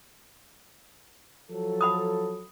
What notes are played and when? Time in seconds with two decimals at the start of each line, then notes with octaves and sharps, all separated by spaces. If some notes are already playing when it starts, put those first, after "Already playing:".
1.51 F3 F#3 A4
1.81 F#5 B5 D#6